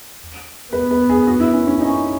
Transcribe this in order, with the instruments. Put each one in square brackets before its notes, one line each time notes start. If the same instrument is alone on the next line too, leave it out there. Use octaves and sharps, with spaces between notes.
[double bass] B3 [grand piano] B4
[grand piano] B4
G#4
F#4
E4
C#4
C#4
[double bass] C#4 [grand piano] D#4